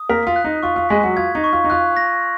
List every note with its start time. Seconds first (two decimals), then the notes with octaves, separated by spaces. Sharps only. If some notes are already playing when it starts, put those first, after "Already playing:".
Already playing: D#6
0.09 A#3 A#4 B6
0.27 F4
0.36 F#6
0.44 D#4
0.63 F4 C#6
0.76 F4
0.89 G#3 G#4 B6
1.03 F#3 F#4
1.17 F4 G#6
1.35 D#4
1.44 C#6
1.53 F4
1.64 D#4
1.70 F4 F#6
1.97 A#6